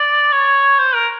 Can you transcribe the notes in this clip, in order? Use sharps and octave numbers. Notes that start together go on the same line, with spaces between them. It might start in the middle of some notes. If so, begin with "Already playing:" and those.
Already playing: D5
C#5
C5
A#4